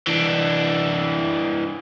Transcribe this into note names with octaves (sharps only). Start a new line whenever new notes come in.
E3 D4